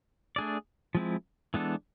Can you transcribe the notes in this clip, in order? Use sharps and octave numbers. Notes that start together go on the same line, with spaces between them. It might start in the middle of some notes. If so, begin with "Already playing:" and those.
A3 D4 G#4 D5
F3 G#3 C4 E4
E3 G#3 B3 D4 A4